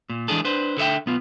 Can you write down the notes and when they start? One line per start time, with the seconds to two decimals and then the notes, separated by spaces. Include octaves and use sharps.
0.10 A#2
0.28 E3 G#3 D4 G#4 A4
0.45 D4 B4 C5
0.77 D3 A4 B4 E5 G5
1.06 B1 B3 F4